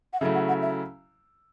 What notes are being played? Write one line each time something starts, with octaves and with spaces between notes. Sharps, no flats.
F#5
C#3 F#3 A3 E4 E5
F#5
F#5
E5